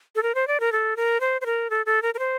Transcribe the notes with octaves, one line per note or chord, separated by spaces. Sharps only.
A4
A#4
C5
D5
A#4
A4
A#4
C5
C5
A#4
A4
A4
A#4
A#4
C5